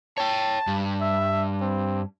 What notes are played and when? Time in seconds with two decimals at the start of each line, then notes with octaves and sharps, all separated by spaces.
0.18 C#5 G5 A5
0.67 G2
1.01 E5
1.61 C4